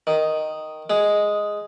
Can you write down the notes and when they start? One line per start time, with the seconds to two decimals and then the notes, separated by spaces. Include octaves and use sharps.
0.07 D#3
0.90 G#3